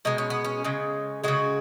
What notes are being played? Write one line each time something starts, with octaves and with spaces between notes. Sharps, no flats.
B2 G#3 D#4
C#4
B3
C#4
C#3 G#3
C#3 G#3 F#4